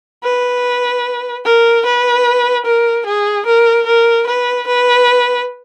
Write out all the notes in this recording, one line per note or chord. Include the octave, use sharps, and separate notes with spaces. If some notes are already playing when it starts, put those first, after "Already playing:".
B4
A#4
B4
A#4
G#4
A#4
A#4
B4
B4